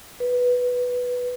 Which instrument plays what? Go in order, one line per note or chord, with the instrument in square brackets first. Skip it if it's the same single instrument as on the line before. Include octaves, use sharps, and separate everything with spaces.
[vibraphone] B4